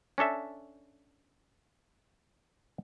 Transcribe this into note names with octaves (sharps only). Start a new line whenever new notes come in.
C#4 D4 A4 E5